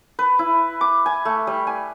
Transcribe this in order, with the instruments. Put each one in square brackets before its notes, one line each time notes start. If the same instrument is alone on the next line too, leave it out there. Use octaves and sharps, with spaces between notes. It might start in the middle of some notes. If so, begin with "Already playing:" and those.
[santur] B4
E4
D6
G#5
A3
G3
G#5